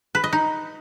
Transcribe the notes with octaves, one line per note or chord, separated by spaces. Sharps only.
B4
D#5
D#4